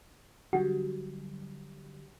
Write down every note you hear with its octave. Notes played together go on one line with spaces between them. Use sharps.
D3 F#3 G3 F#4